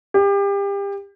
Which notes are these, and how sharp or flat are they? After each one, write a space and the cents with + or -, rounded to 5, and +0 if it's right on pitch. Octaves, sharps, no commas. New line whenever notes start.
G4 +30